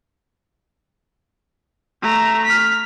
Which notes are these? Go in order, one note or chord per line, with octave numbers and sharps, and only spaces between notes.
A3 A#5
F6 B6